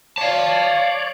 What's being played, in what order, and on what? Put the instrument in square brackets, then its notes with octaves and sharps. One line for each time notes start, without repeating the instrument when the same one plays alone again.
[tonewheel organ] C#5 D5 [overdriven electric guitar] F5 A5